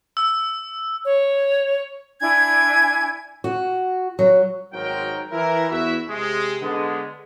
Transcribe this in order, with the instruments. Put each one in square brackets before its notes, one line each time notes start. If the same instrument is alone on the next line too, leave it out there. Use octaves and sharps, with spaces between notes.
[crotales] E6
[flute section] C#5
D4 E4 G#5 G#6
[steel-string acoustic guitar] F#4
F#3
[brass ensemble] G#1 F#3 C4 D#4 A#4 G5
E3 E4 A#4
E2 E4 F#4 E5
C3 G#3
D3 G#3 B3